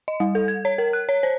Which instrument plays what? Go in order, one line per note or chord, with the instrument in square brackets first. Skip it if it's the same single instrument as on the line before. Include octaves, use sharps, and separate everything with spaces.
[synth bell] D#5
G3
A4
G#6
C#5
A#4
F#6
C#5
C5